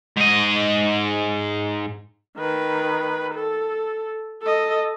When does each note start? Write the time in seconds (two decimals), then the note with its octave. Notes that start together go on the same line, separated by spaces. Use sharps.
0.17 G#2 D#5
2.37 D#3 B4
3.35 A4
4.42 A4 D#5